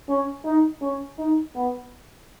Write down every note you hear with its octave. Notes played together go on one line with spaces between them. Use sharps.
C#4
D#4
C#4
D#4
B3